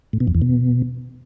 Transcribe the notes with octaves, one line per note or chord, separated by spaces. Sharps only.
A2
B2
F2
E2
B2